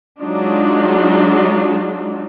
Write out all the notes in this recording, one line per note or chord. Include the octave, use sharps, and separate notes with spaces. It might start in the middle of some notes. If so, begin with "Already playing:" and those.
F#3 G#3 D4 D#4 F4